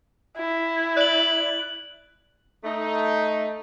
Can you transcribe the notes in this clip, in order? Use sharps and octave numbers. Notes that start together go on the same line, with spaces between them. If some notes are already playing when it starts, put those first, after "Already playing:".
E4
D5 F#6 F#7
A3 D#4